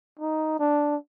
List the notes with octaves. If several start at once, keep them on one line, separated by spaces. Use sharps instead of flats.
D#4
D4